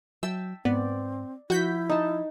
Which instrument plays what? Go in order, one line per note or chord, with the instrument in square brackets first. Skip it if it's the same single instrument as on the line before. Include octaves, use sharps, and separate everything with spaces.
[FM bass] F#3 [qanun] E5 G5 A5 [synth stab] E6
[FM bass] G#2 [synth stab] B3 [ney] C4 [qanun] D5
[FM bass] F3 [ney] E4 [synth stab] F#4 G6 B6
[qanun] D#4 A5